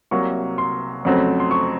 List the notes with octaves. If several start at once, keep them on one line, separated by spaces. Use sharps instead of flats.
C2 C3 F#3 A#3 C#6
C6
F2 C#3 F#3 A3 C4
C6
C#6